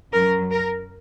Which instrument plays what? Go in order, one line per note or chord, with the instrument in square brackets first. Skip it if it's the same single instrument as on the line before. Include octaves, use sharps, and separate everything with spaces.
[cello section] F#2 F#3 A#4
A#4